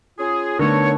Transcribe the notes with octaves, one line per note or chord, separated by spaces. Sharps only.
C#4 F4 G#4
D3 A3 B3 D#4 A#4 C#5